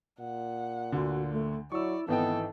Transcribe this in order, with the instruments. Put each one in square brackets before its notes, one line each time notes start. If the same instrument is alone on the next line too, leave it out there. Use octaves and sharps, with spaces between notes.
[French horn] A#2 [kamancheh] F#5
[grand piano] D2 D3 [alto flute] F#4
[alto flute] A3
[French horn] F#3 [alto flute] E4 [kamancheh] D5 [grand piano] C#6 E6
[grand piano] G#1 D#4 G5 [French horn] E3 [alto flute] B3 [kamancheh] A4